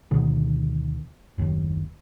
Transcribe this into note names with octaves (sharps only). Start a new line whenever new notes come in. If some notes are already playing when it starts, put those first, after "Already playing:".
D2 B2 D#3
F#1 D#2